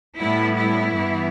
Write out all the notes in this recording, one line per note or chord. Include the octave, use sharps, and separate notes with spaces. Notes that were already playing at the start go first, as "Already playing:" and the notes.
A2 G3 B3 E4
E4
G2 E3 B3